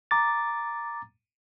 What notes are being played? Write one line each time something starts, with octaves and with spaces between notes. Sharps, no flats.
A#5 D6 A6